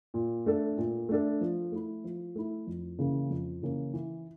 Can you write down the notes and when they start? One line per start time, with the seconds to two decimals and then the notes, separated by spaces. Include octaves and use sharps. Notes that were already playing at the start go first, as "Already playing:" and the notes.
0.14 A#2
0.46 A3 D4 A4
0.78 A#2
1.09 A3 D4 A4
1.41 F3
1.72 A3 E4
2.04 F3
2.35 A3 E4
2.67 F2
2.99 C#3 E3 A#3 C#4
3.30 F2
3.62 C#3 E3 A#3 C#4
3.94 E3